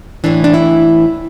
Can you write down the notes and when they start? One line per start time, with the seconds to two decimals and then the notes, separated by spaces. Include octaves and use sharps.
0.24 A2 E3 D4
0.44 D4
0.54 E4